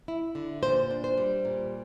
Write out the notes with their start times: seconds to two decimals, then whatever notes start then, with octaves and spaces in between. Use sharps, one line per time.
0.08 E4
0.35 D3
0.63 A#2 C5
0.91 D4
1.04 C5
1.17 G3
1.45 A#2